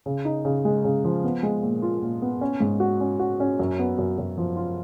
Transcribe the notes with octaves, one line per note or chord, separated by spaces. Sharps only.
C#3
D#4
C#3
G#3
C#3
F3
B3
G#3
A#2
F4
A#2
B3
C#4
G#2
F#4
C#4
F#4
C#4
F#2
B3
F#2
F#2
F3
F4